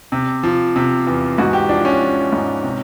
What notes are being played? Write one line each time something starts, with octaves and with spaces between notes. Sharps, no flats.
C3
F3
C3
E2
G#2 F#4
G4
F3 D4
C#4
F3
G#2
C3